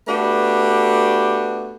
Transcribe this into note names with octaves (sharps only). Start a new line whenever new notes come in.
A3 B3 D4 F#4 G4